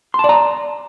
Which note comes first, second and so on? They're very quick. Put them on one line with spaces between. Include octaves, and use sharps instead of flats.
C6 A5 D5 A#5